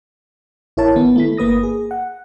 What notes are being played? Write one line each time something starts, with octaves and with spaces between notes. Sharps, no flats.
A1 E4 A#4 C#5 A5
D#3 B3
A3 E4 B6
G1 A#3 B4 D#6 A#6
G#4
F#5